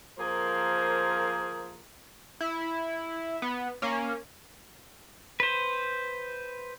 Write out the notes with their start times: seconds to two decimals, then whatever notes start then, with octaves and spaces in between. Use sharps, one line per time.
0.19 F3 A#3 G#4 A#4 C5
2.41 E4
3.42 B3
3.82 A#3 C#4
5.40 B4 C5